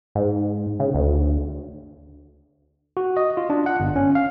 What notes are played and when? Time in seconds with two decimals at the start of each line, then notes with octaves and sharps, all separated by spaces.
0.15 G#2
0.80 C#3
0.94 D2
2.97 F#4
3.17 D#5
3.37 F4
3.50 D4
3.66 F#5
3.80 G1
3.96 C#4
4.15 F5